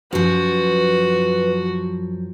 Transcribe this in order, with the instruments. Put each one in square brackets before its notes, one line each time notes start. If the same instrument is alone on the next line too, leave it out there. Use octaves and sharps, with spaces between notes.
[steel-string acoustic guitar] F#2 F3 [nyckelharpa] F#4 [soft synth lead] B4